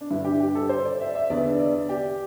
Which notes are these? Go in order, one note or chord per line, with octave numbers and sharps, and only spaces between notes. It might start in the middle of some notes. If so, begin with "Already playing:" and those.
D4
G2 D3 E4
G4
G4
A4
C5
D5
E5
E5
E2 D3 D5
D5
G4